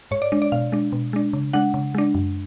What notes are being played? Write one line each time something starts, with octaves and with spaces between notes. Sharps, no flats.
G#2 C#5
D5
G#3 D4
D5
B2 F5
G#3 D4
B2
G#3 D4
C#3
G#3 D4 F#5
C#3
G#3 D4
F#2